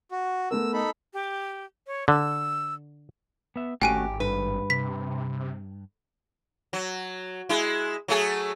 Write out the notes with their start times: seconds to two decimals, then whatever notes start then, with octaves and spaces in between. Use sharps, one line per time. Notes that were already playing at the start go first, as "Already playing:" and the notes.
0.12 F#4
0.51 A3 B3 A#4 E6
0.74 D#4 A4 B5
1.13 G4
1.87 C#5
2.08 D3 E6
3.56 B3 E5
3.82 G#1 A3 C#4 F#4 G4 G5 G#5 D#7
4.20 G2 B4
4.70 C3 B6
6.73 F#3
7.49 G#3 E4
8.08 F#3 A3 G#4